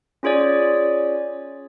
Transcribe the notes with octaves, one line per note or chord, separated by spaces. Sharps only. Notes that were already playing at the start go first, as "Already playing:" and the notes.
C#4 F4 G#4 C#5 D5